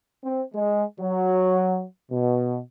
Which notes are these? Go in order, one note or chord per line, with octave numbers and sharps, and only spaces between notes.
C4
G#3
F#3
B2